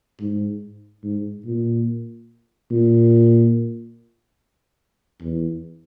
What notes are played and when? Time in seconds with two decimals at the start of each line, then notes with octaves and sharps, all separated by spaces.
0.20 G#2
1.04 G#2
1.45 A#2
2.71 A#2
5.22 E2